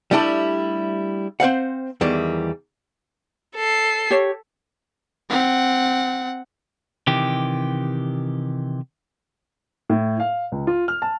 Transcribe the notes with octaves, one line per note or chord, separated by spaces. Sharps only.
G3 A3 D4 E4 G4 A5
C4 C5 F5 F#5
E2 D#3 E3 G3
A4 C7
G4 C#5
C4 F#5
C3 D#3 E3 G4
A2
F5
C#2
F4
F6
A5